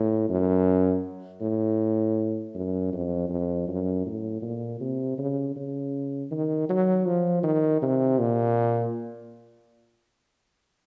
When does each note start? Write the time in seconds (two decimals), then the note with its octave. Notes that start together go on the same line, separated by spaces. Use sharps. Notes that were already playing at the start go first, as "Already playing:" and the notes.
Already playing: A2
0.29 F#2
1.41 A2
2.55 F#2
2.93 F2
3.29 F2
3.68 F#2
4.06 A2
4.42 A#2
4.81 C3
5.18 C#3
5.56 C#3
6.31 D#3
6.69 F#3
7.06 F3
7.43 D#3
7.82 C3
8.19 A#2